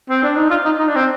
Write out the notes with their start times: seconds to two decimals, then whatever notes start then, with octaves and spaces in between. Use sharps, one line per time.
0.09 C4
0.23 D4
0.36 D#4
0.50 F4
0.65 D#4
0.79 D#4
0.88 D4
0.96 C4